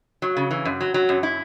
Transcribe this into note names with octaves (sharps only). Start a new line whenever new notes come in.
F#3
C#3
E3
F#2
F#3
F#3
F#2
E4